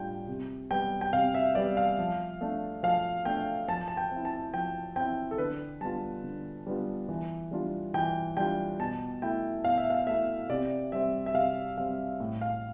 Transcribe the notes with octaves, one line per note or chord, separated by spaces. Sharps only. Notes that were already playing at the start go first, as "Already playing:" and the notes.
Already playing: A2 G3 D4 F4 G5
C3
G3 B3 G5
G5
C3 F5
E5
G3 B3 D5
F5
F3
A3 D4
F3 F5
A3 D4 G5
F3 A5
A5
G5
C4
E4
A5
F3 G5
C4 E4 G5
A4
D3 B4
G3 B3 D4 F4 A5
D3
G3 B3 D4 F4
E3
G3 D4 F4
E3 G5
G3 D4 F4 G5
B2 A5
A3 E4 G5
B2 F5
E5
F5
A3 E4 E5
C3 D5
G3 C4 E5
E5
C3 F5
G3 C4 F5
A2
F5